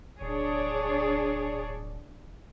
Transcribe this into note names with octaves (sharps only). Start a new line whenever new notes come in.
D1 D4 G#4 C#5